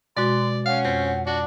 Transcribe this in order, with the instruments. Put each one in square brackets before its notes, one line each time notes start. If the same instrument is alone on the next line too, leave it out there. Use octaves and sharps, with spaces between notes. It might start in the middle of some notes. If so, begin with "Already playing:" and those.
[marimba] B2 G#3 F#4 [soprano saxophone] D5 [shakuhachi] C6
[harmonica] C#4 [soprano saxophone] F5 [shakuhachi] F#5
[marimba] F2 [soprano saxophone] C4
[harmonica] D4 [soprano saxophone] F#4